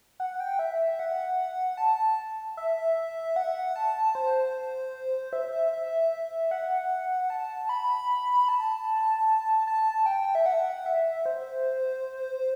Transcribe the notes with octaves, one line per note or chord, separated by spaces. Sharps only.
F#5
G5
E5
F#5
A5
E5
F#5
A5
C5
E5
E5
E5
F#5
A5
B5
A5
A5
G5
E5
F#5
E5
C5